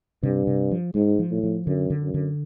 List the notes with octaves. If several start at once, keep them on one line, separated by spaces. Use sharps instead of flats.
G2 C3
C3
F3
G#2 G#3
F3
A2
F3
F#2 D3
D3
F#2
D3